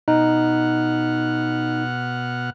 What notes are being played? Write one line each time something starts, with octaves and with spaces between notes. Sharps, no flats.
B2 D#4 F#5 F6